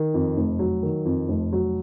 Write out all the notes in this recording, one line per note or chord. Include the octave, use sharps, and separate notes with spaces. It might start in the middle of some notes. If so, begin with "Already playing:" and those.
Already playing: D#3
F2
F1
F#3
D#3
F2
F1
F#3